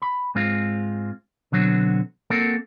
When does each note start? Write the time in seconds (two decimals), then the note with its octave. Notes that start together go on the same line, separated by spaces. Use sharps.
0.02 B5
0.35 G#2 G#3 C4 F4
1.52 B2 D3 F#3 C4 F#4
2.30 A#3 C4 F#4 A4 A#4